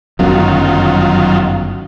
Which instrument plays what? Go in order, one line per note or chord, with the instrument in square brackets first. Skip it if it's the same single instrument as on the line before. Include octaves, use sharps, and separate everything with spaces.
[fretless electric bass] G1 F#2 [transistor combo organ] D#3 F#3 F4